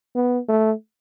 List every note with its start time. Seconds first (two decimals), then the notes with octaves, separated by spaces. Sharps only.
0.15 B3
0.48 A3